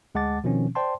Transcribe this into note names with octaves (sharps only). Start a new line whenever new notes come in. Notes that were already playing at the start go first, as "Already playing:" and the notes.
D2 G#3 F#5 A5 D6 A6
B2 D#3 F3 C4 C#4
C5 D5 G5 A5 C6